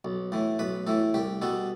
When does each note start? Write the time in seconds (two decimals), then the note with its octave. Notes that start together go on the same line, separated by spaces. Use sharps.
0.05 B1
0.32 A2 E3
0.59 B1 B4
0.87 A2 E3 A4
1.14 C2 G4
1.42 B2 G3 B3 A4